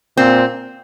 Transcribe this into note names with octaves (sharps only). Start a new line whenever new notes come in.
A#2 C4